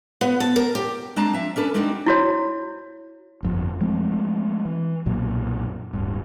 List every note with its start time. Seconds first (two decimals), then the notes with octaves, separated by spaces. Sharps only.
0.21 B3
0.40 A5
0.56 A#4
0.75 G4
1.16 G#3 C4 D4 A5 A#5
1.33 F3 E5
1.56 C#4 D4 A4 B4
1.74 G#3 C4 D4 D#4 F#4
2.06 E4 F#4 C#5
3.43 G1 F2
3.81 F3 G#3 A3 C4
4.65 E3
5.06 B1 F#2 A#2 F#3
5.93 D1 G2